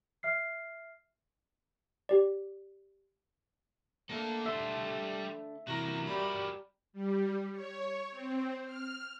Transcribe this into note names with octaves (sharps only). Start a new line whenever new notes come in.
E5 F6 C7
G4 D5
A3 A#3 D4 A4
G3 E5 C6
C3 E3 F#4 A#4 A#5
G3 B5
G3
C#5
C4
F6